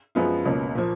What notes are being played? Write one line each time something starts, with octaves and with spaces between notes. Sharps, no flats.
F#2 F3 G#3 B3 F4
C#2 B2 A#3 C#4
A#2 F3 A#3